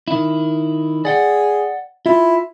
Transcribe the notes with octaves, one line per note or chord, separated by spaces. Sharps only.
D#3 E4
G#4 D5 F#5 G5
E4 F4